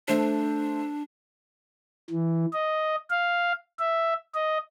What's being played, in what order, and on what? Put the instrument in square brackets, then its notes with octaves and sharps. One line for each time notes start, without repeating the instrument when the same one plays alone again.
[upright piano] A3 C5 [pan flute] D4
[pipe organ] E3
D#5
F5
E5
D#5